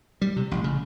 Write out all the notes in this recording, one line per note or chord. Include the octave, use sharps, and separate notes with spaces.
G3
C3
A1
C#3